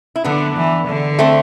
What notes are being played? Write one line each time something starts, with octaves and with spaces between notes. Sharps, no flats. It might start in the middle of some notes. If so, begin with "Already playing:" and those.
E4
D3 B3 D4
E3
D3
A3 C4